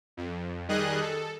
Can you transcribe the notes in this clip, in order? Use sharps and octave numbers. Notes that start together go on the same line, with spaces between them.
F2
D#3 G3 G#4 D#5 F#6
A4